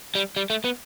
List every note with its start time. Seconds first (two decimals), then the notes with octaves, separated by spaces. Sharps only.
0.15 G3
0.36 G3
0.50 A3
0.64 B3